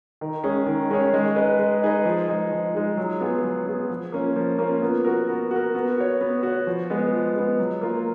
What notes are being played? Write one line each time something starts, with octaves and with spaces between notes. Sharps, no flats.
D#3
G#3 C#4 G#4 C#5
D#3
G#3 C#4 G#4 C#5
G#3
D#4 G#4 B4 D#5
G#3
D#4 G#4 B4 D#5
F3
G#3 D#4 G#4
F3
G#3 D#4 G#4
F#3
B3 F4 G#4
F#3
B3 F4 G#4
F3
A#3 C#4 F4
F3
A#3 C#4 F4
B3
F#4 A#4
B3
F#4 A#4
B3
F#4 C#5
B3
F#4 C#5
F3
G#3 B3
F3
G#3 B3
F#3
A#3 F4